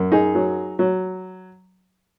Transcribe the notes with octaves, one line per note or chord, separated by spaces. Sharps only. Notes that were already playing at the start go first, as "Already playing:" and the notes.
Already playing: F#2
D#4 G#4
F#3
F#3